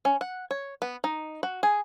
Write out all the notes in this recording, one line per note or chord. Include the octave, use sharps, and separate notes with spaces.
C#4
F#5
C#5
B3
D#4
F#4
G#4